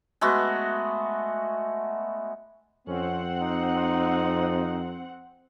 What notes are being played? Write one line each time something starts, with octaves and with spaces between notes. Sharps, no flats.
G#3 A3 B3 F#4
F2 C4 C#4 F#5
D#4